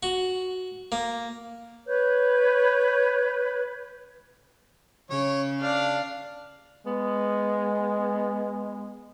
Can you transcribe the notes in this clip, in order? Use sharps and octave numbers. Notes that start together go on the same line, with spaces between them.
F#4
A#3
B4 C#5 G6
C#3 C#5
D4 D5 F5
G#3 B3